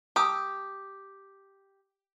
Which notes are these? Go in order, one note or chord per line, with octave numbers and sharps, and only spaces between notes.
G4 A5 D#6 E6